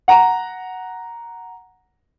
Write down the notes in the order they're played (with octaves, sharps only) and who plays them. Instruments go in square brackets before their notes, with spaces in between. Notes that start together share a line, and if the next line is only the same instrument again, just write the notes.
[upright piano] F#5 A#5